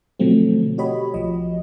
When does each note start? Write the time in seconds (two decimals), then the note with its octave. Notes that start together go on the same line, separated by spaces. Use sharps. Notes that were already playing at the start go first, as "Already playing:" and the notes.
0.20 B2 D3 F3 F#3 A3 C4
0.78 F#4 G4 C#5 D#5 B5
1.14 B1 F3 D#5